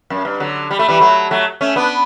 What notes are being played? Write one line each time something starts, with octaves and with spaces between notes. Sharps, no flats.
F#2
G2
D3 F#3
G3
A3
E3 G3
F#3 A3
F#3 A3
A3 C#4
B3 D4